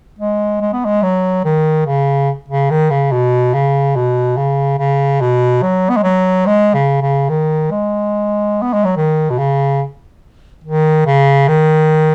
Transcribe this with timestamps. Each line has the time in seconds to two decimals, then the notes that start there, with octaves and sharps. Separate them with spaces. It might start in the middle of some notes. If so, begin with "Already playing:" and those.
0.19 G#3
0.61 G#3
0.73 B3
0.85 G#3
1.03 F#3
1.45 D#3
1.86 C#3
2.49 C#3
2.70 D#3
2.90 C#3
3.12 B2
3.54 C#3
3.95 B2
4.37 C#3
4.79 C#3
5.21 B2
5.62 F#3
5.89 B3
5.97 G#3
6.04 F#3
6.46 G#3
6.74 C#3
7.02 C#3
7.29 D#3
7.71 G#3
8.62 B3
8.73 G#3
8.85 F#3
8.97 D#3
9.30 B2
9.38 C#3
10.64 D#3
11.06 C#3
11.48 D#3